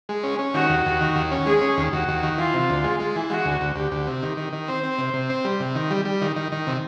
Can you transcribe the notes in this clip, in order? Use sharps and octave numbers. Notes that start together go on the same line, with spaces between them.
G#3
C#4
C#4
D#3 F#4
D#2
D#2
D#3
D#2
C#4
G#3 G#4
C#4
D#2
D#2 F#4
D#2
D#3
E3 F4
C3
D2
G#3
G#3
E3
G#3 F#4
D2
D2
D2 G4
D2
C3
D#3
D#3
D#3
C4 C5
C4
C3
C3
C4
G3
C3
D#3
G3
G3
D#3
D#3
D#3
C3